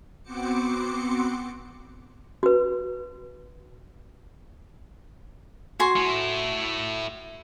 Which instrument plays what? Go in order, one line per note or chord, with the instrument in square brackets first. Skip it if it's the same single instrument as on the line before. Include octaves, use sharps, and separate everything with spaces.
[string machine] B3 C4 F#4 C5 D6 C#7
[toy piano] F#4 B4
[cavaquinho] F#4 G#5 C6
[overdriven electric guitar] A3 E4